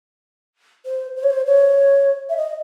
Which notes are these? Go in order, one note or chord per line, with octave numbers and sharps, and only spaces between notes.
C5
C5
C#5
C5
C#5
E5
D#5